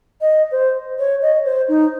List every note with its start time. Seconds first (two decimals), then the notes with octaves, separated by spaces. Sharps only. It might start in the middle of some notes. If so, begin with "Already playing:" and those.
0.21 D#5
0.52 C5
0.99 C#5
1.22 D#5
1.45 C5
1.68 D#4